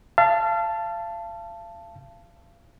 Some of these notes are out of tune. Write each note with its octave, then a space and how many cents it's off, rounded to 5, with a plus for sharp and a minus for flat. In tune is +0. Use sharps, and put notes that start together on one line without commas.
F5 -35 A5 +0